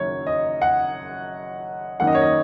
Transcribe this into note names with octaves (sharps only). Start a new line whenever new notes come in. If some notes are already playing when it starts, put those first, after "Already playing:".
Already playing: F#1 F#2 D#3 F#3 C#5
D#5
F#5
F#2 D#3 A#3 F#5
D#5
C#5
D#5